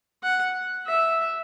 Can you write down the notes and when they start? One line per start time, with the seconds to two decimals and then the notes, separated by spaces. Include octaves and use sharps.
0.23 F#5
0.87 E5